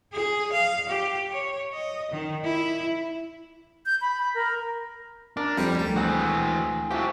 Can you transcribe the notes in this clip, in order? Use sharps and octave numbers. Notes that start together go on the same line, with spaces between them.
G#4
F5
G4
C#5
D#5
D#3
E4
G6
B5
A#4
D4 A#4
F2 G3 C#4 C5 B5
D2 G5
E3 C4 F#4 G#4
F3 E4 F#4 G4